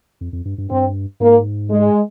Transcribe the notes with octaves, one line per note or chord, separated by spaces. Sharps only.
F2
F2
G2
G2
G2 C4
G#2 A#3
G#3